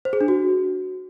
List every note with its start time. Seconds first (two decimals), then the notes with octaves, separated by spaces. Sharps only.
0.05 C5
0.13 G#4
0.21 D4
0.28 F#4